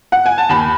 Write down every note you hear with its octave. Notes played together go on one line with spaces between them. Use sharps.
F#5
G#5
A5
D#2 B5